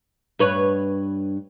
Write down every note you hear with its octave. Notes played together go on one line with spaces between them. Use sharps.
G2 B4 C#5